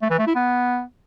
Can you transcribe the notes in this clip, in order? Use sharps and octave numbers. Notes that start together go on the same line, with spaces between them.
A3
E3
A3
E4
B3